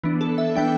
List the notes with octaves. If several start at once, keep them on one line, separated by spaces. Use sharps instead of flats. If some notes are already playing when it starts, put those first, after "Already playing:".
E3 B3 D4
A4
E5
E3 B3 D4 G5